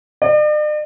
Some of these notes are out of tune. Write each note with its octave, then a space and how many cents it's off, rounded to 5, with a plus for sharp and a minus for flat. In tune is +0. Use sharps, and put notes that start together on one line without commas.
D5 +45